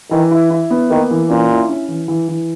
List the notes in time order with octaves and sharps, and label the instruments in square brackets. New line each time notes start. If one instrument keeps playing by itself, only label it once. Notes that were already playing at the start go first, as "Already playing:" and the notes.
[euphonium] D#3 [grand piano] E3
[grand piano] E4
E4
B3
[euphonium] D#3 [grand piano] A#3
[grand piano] E3
[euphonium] A#2 [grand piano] C#4
[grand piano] E4
C#4
E3
E3
E3